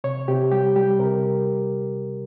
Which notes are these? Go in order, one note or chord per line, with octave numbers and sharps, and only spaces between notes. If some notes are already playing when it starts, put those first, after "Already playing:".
C3 C#5
C3 G4
G3 G4
G3 G4
C3 A#4